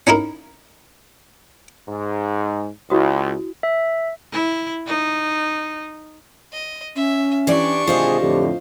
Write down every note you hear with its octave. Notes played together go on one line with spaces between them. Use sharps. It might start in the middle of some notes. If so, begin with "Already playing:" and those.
C#4 D#4 E4 A#4
G#2
C#2 E4 F#4 D#6
E5
E4
D#4
D#5
C#4 E5
E3 D4 G4 D5 C#6
G#1 C3 F4 G#4 C5 D#5
F2 A2 D3 G4